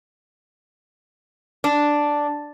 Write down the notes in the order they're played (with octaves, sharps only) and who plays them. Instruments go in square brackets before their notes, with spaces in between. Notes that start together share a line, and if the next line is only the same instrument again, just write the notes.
[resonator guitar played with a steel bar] D4